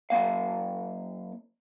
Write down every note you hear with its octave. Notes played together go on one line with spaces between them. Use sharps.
F#2 D#3 A#3 F5